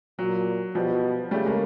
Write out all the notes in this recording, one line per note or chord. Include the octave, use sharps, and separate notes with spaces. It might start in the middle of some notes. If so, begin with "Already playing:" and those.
A#2 F#3
B2 F3 G3
C#3 G3 A3
G#3 A#3